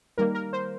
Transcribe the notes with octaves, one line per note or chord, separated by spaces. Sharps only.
D#3 G3 A#3 A#4
A#4
C5